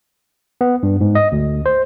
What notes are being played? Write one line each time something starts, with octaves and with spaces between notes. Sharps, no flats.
B3
G2
G#2
D#5
D2
C5